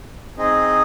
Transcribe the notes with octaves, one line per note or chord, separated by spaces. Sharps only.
C4 D#4 G#4 D#5